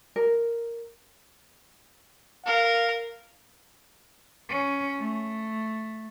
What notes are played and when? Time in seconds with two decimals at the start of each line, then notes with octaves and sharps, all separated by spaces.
0.16 A#4
2.46 A#4 F5
4.49 C#4
4.99 A3